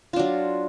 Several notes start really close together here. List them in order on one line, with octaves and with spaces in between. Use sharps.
F4 D4 F#3